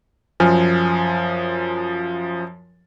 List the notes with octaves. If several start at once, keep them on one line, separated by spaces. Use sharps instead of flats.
F#2 F3 G#5 F6